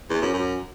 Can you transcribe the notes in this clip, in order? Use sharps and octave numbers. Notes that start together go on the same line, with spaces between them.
E2
F#2
F#2